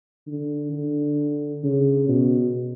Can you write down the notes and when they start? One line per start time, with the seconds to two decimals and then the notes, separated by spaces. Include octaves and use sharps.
0.27 D3
0.72 D3
1.64 C#3
2.09 B2